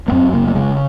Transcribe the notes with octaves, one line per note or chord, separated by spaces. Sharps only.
A#3
F#2 C4
C#3 A#3
A#3
C#3 G#3